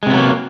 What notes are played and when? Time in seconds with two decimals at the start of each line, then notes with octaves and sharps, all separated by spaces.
0.03 G#3
0.06 C3
0.10 B3
0.14 F#3
0.18 A#3